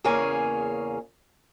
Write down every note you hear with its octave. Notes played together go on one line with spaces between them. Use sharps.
E2 C#3 A#3 C#4 G#4 G#5